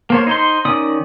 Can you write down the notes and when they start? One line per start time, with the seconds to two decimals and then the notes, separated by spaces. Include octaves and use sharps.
0.10 A#3 C5 C#5
0.27 D#4 C5 C6
0.65 D#3 C#4 D5 D#6